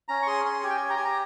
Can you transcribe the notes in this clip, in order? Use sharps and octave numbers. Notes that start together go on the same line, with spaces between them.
C#4 A#5
C#6
G#4 C6
C#4 C6
G4 G#5
G5
G4 G#5
A#5
G4 G#5
A#5